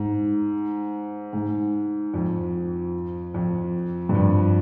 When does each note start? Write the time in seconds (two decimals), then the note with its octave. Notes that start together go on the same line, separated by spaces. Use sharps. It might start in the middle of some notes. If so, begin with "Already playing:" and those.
Already playing: G#2
1.33 G#2
2.14 F2
3.34 F2
4.09 G2
4.15 F2